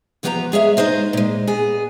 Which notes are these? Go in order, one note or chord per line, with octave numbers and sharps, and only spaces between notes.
E2 F3 B3 G4 F5 A#5
G#3 G#4 C#5 E5 F5
G#3 D#4 G#4 C5 D#5
A#2 G#3
B3 G#4